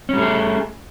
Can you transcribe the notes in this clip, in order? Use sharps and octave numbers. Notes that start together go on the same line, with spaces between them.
G3 A3 C#4 G#4